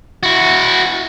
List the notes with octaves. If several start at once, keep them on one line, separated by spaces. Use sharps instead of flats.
E4 F#4